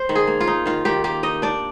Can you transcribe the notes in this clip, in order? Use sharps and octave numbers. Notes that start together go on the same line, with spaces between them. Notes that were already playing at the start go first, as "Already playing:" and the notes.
Already playing: C5
D#3
G#4
A#3
F4
D#4
D#3 F4
D#3 G4
A#3 G4
D#4 D#5
D4 D5